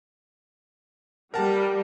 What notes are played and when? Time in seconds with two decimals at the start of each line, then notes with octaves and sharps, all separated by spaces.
1.34 G3 A#4 F#5 A5